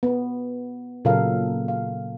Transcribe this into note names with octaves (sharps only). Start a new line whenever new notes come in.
B3
A#2 C#3 F#3 A4 A#4 F5
F5